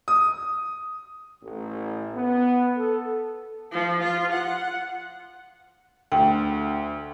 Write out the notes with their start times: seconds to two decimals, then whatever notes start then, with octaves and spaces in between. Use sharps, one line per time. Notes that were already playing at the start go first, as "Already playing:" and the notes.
0.08 D#6
1.42 A1
2.14 B3
2.76 A4
3.72 F3
4.03 F4
4.32 F#5
6.12 D2 G5